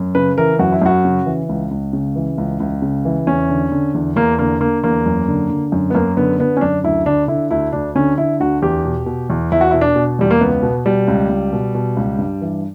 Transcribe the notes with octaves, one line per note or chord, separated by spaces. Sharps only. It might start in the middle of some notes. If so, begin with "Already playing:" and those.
Already playing: F#2
C#3 B4
E3 A#4
F#2 F#4
E4
F#2 F#4
C#3
E3
C#2
C#2
C#3
E3
C#2
C#2
C#3
E3
E2 C#4
D3
D3
E2
E2 A#3
D3 A#3
D3 A#3
E2 A#3
F#2
D3
D3
F#2
B3
F#2 A#3
D3 B3
D3 B3
C#4
F#2 D4
D2 E4
D3 D4
D3 E4
D2 E4
D2 D4
D3 C#4
D3 E4
D2 F#4
E2 G4
B2
B2
E2
E2 E4
F#4
E4
B2
D4
B2
E2 G3
A#3
C#2 B3
B2
B2 G3
C#2
C#2
B2
B2
C#2
G2
E3